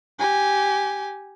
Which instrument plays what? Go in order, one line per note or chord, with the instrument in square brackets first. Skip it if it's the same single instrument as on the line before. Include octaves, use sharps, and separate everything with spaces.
[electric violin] G4 G#5